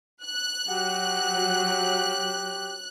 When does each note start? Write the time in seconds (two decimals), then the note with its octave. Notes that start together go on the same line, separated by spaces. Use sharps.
0.23 F#6
0.69 F#3 G4 F#5